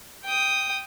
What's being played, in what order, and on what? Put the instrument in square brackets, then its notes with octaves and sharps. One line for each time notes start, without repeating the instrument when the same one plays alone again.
[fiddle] G5 D#6